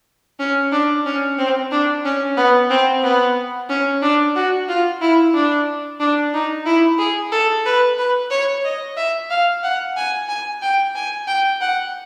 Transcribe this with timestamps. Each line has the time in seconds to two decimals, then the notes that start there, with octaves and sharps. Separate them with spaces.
0.39 C#4
0.72 D4
1.06 C#4
1.38 C4
1.72 D4
2.05 C#4
2.37 B3
2.70 C4
3.03 B3
3.69 C#4
4.02 D4
4.35 F#4
4.69 F4
5.02 E4
5.34 D4
6.00 D4
6.34 D#4
6.66 E4
6.99 G#4
7.32 A4
7.65 B4
7.98 B4
8.31 C#5
8.65 D#5
8.97 E5
9.30 F5
9.63 F#5
9.97 G#5
10.29 G#5
10.62 G5
10.95 G#5
11.27 G5
11.61 F#5